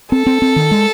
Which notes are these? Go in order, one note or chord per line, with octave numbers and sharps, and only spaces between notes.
C4 A4
C4
C4
D#3
G#3